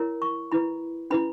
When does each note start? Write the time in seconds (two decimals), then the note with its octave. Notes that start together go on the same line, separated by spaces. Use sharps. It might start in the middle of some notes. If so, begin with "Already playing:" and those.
Already playing: E4 A#4 C#5
0.22 C#6
0.52 E4 B4 B5
1.10 C#4 E4 B4 B5